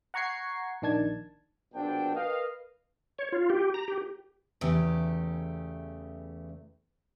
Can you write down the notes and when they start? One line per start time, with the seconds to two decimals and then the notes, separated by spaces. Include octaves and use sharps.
0.14 F#5 A#5 C#6 G#6 C7 C#7
0.82 A#1 D#3 D4 A5 G#6
1.74 A#1 B2 C4 D4 G5
2.15 A#4 B4 D#5 F5
3.19 C#5
3.32 F4
3.50 G4
3.74 A#5
3.88 G4
4.61 E2 C#3 A3 G4